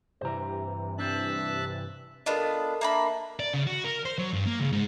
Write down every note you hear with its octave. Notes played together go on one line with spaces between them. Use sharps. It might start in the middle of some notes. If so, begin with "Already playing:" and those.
G2 C3 E3 C5 A#5
C4 D4 E5 A5 F#6
B3 D4 F4 A4 A#4 D#5
A#3 D4 E5 B5
D5
C#3
F#4
A#4
C5
F#3
G2
A#3
C#2
G#2